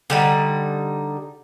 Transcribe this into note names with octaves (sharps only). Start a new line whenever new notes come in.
D3 G3 D#4